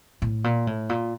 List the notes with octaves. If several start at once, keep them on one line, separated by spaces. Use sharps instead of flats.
A2
A#2
A2
A#2